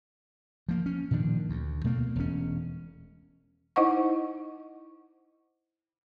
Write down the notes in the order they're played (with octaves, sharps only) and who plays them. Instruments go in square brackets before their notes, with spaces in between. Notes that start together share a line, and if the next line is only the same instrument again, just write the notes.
[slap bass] F3 A#3
C#4
A#2 D#3 F3 D4
D2
B2 A3 A#3
E1 C#4
[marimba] D#4 E4 C5 D#5 F#5 C#6